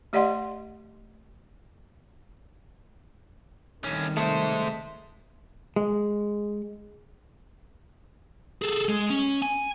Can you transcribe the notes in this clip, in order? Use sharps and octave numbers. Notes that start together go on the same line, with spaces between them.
A3 G4 D5 D#5 F#5 C6
A2 C3 D#3 G3 C#4
G#3 A3 C5
G#3
G#4 A4
G#3
C#4
G#5